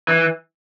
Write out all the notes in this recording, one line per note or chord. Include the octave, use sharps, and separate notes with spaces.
E3